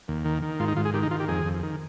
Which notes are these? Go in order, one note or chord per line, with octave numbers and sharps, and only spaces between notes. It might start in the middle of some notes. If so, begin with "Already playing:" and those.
D#2
D#3
D#3
G#2 F4
D#4
G#2 F4
G#4
D#3 G4
D#4
D#3 F4
G4
F2 G#4
F2
D#3